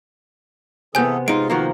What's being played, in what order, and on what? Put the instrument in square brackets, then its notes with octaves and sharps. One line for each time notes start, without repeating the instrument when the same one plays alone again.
[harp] C3 B3 [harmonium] E3 G#4 A4 [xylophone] G#5 G6
[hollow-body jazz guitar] G#3 D#4 [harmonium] F4 [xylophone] D7
[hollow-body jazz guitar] D#3 F3 A#3 [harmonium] F#4